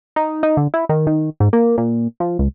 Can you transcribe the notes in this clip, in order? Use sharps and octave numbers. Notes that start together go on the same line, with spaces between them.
D#4
D#4
D3
E4
D#3
D#3
G#2
A#3
A#2
F3
C#2